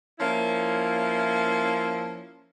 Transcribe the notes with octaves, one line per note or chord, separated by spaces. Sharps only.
F3 A#3 C#4 E4